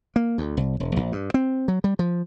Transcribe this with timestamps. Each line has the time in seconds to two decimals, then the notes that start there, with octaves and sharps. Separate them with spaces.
0.16 A#3
0.38 D2
0.57 C2
0.80 E1
0.96 A#1
1.12 G2
1.34 C4
1.68 F#3
1.84 G3
1.99 F3